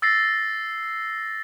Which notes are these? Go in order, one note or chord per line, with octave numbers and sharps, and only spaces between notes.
E6 A6 A#6 C7